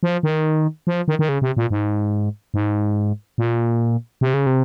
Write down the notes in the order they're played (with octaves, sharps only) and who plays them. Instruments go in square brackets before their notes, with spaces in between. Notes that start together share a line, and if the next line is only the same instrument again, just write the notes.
[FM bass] F3
D#3
F3
D#3
D#3
C#3
C3
A#2
G#2
G#2
A#2
C3
C#3
C3